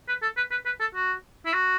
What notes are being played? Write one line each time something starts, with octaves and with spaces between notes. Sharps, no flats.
B4
A4
B4
B4
B4
A4
F#4
E4
F#4